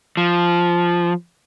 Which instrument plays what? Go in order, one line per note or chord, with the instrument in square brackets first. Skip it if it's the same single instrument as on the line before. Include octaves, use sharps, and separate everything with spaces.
[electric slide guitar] F3